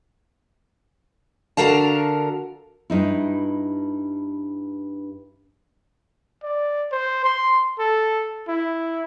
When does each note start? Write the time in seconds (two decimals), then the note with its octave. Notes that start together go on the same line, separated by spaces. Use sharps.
1.57 D3 F#4 A#4 F5 A5
2.90 G2 D#4 E4
6.43 D5
6.92 C5
7.25 C6
7.79 A4
8.48 E4